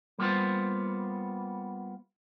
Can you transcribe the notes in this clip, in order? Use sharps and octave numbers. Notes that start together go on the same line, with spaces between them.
G3 A#3 B3 F4 C5